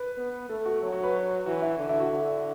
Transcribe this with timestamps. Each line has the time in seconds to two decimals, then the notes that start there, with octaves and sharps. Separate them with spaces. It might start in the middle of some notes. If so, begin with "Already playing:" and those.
Already playing: B4
0.18 B3
0.50 A3 A4
0.66 F#4
0.82 F#3
0.92 F#4
1.03 B4
1.46 E3 F#4
1.62 E4
1.78 D3
1.89 E4
2.00 F#4
2.11 D3